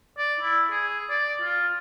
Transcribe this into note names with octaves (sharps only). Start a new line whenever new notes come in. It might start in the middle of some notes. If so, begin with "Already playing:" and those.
D5
E4
G#4
D5
F4